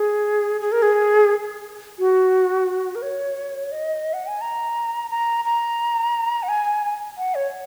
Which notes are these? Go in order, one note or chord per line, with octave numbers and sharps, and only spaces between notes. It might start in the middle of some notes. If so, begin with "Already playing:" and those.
Already playing: G#4
G#4
A#4
G#4
F#4
A#4
C#5
D#5
F#5
G#5
A#5
A#5
A#5
F#5
G#5
F#5
C#5